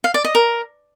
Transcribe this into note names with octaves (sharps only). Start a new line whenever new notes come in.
F5
D5
D#5
A#4